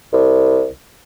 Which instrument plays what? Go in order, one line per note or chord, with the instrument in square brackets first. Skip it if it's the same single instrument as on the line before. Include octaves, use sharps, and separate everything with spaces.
[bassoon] C2